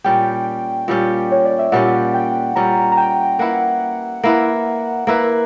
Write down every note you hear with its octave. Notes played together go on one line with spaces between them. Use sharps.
A#2 G3 C#4 G4 G5
A#2 G3 C#4 G4
C#5
D5
E5
A#2 G3 C#4 G4 F#5
G5
A#2 G3 C#4 G4 A#5
A#5
G5
A#3 E4 B4 F#5
A#3 E4 B4
A#3 E4 A#4 B4
A#4